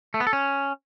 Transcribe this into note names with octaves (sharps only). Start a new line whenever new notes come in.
A3
B3
A4
C#4